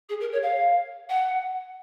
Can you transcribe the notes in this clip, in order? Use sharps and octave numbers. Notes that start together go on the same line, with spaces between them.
G#4
A#4
C#5
F5
F#5